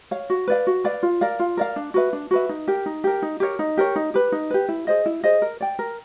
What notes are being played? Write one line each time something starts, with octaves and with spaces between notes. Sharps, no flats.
C#5 F5
F#4
B4 D5 F5
F#4
B4 D5 F5
F4
A#4 D5 F5
F4
A#4 D5 F5
D4
F#4 B4 E5
D4
F#4 B4 E5
D#4
G4 A#4
D#4
G4 A#4
D#4
G4 A#4 C#5
D#4
G4 A#4 C#5
D#4
G4 B4
D#4
G4 B4
E4
G#4 C5 D#5
E4
G#4 C5 D#5
A#4
D5 G5
A#4